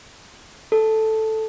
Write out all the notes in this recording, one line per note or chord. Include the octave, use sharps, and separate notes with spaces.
A4